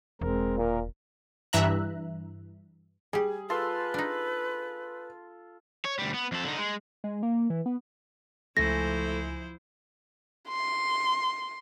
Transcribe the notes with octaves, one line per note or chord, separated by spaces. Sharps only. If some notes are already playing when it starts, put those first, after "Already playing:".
E1 G#3 C4 A#4
A#2 A#4
G2 E3 E5 A#5 F#6
G3 G4 G#4
F4 A4 B4 C6
D4 D#4
C#5
D2 G3
B3
F2 A4
D3 D#4
G#3
G#3
A#3
E3
B3
C#2 F3 A3 E4 C5 G#5 A#6
C6